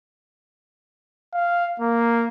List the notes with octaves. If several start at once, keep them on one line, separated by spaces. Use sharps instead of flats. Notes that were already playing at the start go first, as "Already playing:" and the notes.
F5
A#3